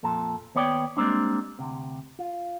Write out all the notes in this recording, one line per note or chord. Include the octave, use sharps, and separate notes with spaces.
F2 A#2 A4
D#2 B3 C#5 D5 G5
G3 G#3 A#3 C4 D4
D2 C3
F4